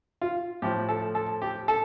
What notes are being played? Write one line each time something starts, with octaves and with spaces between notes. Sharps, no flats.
F4
A2 F3 G4
A4
A4
G4
A4